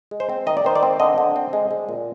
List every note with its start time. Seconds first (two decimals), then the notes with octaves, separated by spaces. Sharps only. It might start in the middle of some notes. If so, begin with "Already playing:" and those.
0.11 G#3
0.20 C5
0.29 C4
0.46 D#3 D#5
0.57 D5
0.65 D#3 C5
0.75 D5
0.83 C4
1.00 D3 D#5
1.18 D3
1.36 C4
1.53 G#3
1.71 G#3
1.89 A#2